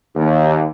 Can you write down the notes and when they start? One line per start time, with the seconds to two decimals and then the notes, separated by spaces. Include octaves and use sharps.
0.16 D#2